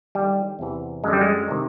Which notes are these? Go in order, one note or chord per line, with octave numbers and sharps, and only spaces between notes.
D#2 D3 G3
E2 C3 E3
F#2 D3 G#3
G3
G#3
C3 D#3